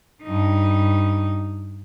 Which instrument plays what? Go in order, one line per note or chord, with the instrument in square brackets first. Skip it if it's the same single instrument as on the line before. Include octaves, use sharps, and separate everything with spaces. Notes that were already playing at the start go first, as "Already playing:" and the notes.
[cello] G2 D#4